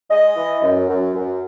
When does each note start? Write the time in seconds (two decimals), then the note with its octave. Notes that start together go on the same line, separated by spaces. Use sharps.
0.10 G#3 D#5
0.35 E3
0.63 F#2
0.88 F#2
1.14 F#2